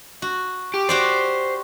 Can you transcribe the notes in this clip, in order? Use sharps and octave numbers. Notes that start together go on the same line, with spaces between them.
F#4
G4
F#4 G4 C5 D5